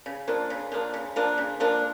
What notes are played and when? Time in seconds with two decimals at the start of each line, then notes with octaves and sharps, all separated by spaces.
0.06 C#3
0.28 F3 A#3 D4
0.50 C#3
0.72 F3 A#3 D4
0.94 C#3
1.16 F3 A#3 D4
1.38 C#3
1.60 F3 A#3 D4